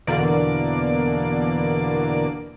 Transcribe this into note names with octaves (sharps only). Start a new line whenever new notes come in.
E2 B2 D3 A#3 D5 D7